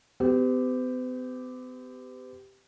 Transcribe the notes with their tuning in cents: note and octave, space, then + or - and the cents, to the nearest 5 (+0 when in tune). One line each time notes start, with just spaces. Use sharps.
B3 +45 G4 +0